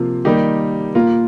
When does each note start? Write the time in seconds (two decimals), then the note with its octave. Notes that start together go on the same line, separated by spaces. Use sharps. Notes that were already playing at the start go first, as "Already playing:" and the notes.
Already playing: C3 F3 A#3 F4
0.25 D#3 G3 A#3 D#4 G4
0.95 A#2 A#3 F4 A#4